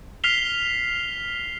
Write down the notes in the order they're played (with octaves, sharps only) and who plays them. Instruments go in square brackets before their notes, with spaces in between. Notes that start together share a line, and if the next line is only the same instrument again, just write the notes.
[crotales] F6 B6 C7 F7 G7